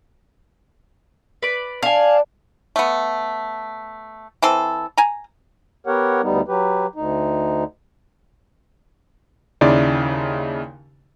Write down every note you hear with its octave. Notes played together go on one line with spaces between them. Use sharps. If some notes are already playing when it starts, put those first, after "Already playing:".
B4 D5
D4 F5 G#5
A3 B3
E3 C4 A4
G#5 A#5
B3 G4 A#4 C#5 F#5
D2 G3 B3 D#4
F#3 G4 B4
D2 D#4
D#2 C#3 D#4 E4 D5 C6